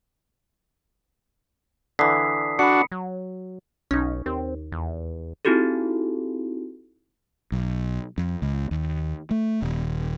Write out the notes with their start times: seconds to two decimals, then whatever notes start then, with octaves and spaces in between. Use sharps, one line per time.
1.99 D3 E3 D#6 B6 C7
2.59 D4 F#4 B5 C#7
2.92 F#3
3.91 B1 C#4 D#4
4.26 D#2 C4
4.72 E2
5.45 C4 D#4 E4 F#4 G4 A4
7.52 B1
8.18 F2
8.42 C#2
8.71 D#2
9.31 A3
9.62 D#1